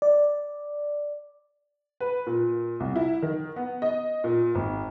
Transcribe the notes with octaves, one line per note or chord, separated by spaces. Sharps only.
D5
B4
A#2
C2
E4
D#3
B3
D#5
A#2
G#1